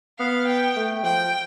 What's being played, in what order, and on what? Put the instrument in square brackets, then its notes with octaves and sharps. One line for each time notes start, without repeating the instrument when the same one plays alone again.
[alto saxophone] B3 [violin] F5
[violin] G5
[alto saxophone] A3
[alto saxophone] F3 [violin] G5